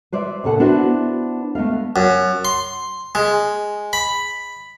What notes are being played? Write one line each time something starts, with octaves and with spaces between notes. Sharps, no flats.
B4 C5 D5 E5
D2 A#2 C#3 A4 F#5
B3 D4 E4 F#4 B4 C5
A3 B3 D#5 F5
F#2
C6
G#3
B5